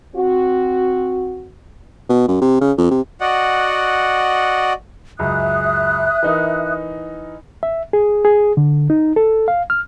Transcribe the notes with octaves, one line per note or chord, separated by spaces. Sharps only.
C4 F#4
B2
F#2
C3
C#3
F2
C3
F#4 D5 D#5 F#5
C#2 F#2 E5 D#6 F#6
E3 D#4 A#4
E5
G#4
G#4
D3
D#4
A4
F5
F6